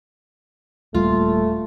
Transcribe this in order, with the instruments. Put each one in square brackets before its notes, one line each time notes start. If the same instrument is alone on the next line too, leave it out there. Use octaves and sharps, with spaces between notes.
[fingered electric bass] D#1 G3 A#3 [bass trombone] A3 [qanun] F4